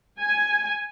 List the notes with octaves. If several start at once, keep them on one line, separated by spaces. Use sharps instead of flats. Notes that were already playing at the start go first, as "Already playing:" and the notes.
G#5